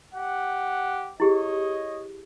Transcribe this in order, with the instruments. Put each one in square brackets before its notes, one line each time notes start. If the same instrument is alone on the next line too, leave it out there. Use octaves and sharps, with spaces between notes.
[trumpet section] G4 F#5
[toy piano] E4 G4 G#4 [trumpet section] C#5 D#5